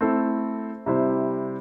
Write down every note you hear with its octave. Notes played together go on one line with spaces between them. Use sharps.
A3 C4 E4 A4
C3 G3 E4 C5